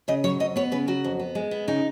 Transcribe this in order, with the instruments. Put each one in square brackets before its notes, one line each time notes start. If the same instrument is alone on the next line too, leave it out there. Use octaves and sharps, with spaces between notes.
[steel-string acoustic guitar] C#3 D#5
F#3 C#5
F2 D#5
B3 C#5
C#3 B4
F#3 F#4
F2
B3
G#3
B3
C#3 D#4